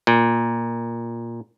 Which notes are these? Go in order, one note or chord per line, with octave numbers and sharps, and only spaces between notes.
A#2